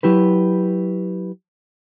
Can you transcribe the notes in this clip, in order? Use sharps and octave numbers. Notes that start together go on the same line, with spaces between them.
F#3 E4 G4 B4